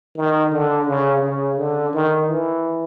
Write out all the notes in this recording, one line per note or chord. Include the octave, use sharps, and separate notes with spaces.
D#3
D3
C#3
C#3
D3
D#3
E3